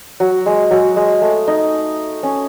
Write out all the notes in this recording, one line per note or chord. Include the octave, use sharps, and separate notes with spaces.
F#3
G#3
F#3
G#3
A3
D#4
C#4